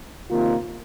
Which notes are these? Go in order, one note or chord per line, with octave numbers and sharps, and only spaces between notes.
C3 D#3 A#3 F4